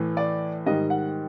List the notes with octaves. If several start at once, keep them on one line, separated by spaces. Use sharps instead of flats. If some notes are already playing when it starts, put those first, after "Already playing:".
Already playing: A2 E3 A3
D5
G#2 D#3 G3 D#5
F#5